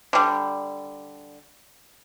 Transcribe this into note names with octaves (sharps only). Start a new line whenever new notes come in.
D3 G3